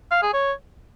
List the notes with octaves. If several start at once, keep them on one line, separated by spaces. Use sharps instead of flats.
F5
G#4
C#5